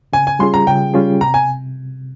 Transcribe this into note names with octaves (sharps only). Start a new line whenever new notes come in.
C#3 G#5
G#5
G3 C#4 F4 G#4 C6
A#5
C#3 G5
G3 C#4 F4 G#4
C3 A#5
G#5